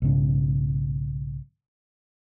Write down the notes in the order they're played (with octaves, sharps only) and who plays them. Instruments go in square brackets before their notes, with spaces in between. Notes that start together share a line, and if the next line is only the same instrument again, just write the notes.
[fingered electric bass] B1 G#2 C#3